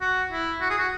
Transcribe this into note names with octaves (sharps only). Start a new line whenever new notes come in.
F#4
E4
F#4
G#4
F#4